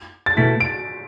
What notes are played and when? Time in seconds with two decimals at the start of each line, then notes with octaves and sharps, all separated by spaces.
0.26 A6
0.37 B2 A3 E4 B6
0.60 D7